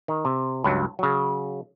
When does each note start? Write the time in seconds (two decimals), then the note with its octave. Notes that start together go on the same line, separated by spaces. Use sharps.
0.08 D#3
0.25 C3
0.64 C#2 G2 F#3
0.99 C#3 F#3